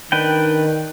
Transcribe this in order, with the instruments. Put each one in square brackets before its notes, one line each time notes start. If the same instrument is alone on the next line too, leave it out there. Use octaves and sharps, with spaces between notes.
[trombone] D#3 [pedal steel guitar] D4 B4 G5